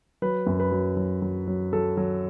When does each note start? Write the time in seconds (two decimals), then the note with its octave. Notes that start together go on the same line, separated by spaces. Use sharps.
0.22 F#3 B4
0.46 F#2
0.60 B4
0.72 F#3
0.97 F#3
1.22 F#3
1.48 F#3
1.73 F#3 A4
1.97 F#3